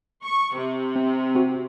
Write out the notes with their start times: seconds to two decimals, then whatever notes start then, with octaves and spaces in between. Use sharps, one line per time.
0.25 C#6
0.55 C3
0.96 C4
1.35 C4 F#4